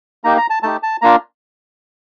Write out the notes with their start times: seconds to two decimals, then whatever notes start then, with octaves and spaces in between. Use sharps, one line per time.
0.24 A#3 D#4 G4 A#5
0.37 A#5
0.50 A5
0.63 A3 D#4 G4 A5
0.83 A5
1.02 A#3 D4 F4 A#5